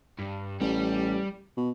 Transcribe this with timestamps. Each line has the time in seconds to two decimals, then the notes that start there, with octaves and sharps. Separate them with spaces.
0.19 G2
0.61 A1 G3
1.57 B2